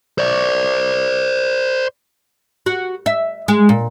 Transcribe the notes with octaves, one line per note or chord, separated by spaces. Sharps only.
C5 D5
F#4
E5
G#3
A#2